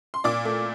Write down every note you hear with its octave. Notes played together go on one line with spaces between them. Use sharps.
C6
A#2 D5 D6
A3